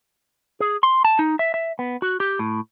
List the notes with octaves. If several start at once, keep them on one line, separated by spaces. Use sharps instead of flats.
G#4
C6
A5
D#4
E5
E5
B3
F#4
G4
A2